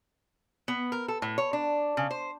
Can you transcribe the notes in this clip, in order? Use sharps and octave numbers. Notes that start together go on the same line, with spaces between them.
B3
A#4
A4
A2
C#5
D4
C#3
C5